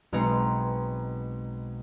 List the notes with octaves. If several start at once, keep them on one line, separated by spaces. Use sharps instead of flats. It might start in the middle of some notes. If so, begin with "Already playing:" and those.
B1 B2 G#3 C4 A#5 C#7